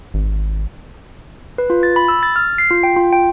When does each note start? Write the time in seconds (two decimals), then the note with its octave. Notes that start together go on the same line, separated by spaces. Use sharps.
0.14 G#1
1.58 B4
1.70 F4
1.83 A6
1.96 B5
2.08 E6
2.23 A6
2.36 F6
2.58 C7
2.70 F4
2.83 G5
2.96 F4
3.13 G5